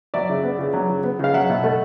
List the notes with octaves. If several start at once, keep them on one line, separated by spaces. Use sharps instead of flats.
F#3 D5 E5
C#3
B3
C#3
F#3
C#3
B3
C#3 F5
F#3 E5 F#5
B2
A3